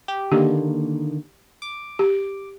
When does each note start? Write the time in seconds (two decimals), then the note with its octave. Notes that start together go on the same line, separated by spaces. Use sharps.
0.08 G4
0.32 D3 D#3 A#3 G4
1.62 D6
1.99 G4